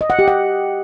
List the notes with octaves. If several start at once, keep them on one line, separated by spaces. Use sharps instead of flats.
D#5
F#5
G4
F#5